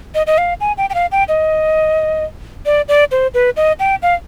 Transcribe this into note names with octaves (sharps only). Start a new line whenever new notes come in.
D#5
D#5
F5
G#5
G5
G5
F5
G5
D#5
D5
D5
C5
B4
D#5
G5
F5